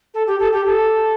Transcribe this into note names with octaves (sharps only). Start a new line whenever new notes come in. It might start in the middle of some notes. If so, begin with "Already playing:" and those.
A4
G4
A4
G4
A4